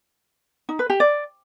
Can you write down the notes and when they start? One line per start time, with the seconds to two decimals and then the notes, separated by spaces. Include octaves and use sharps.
0.69 D#4
0.79 B4
0.90 G4
1.00 D5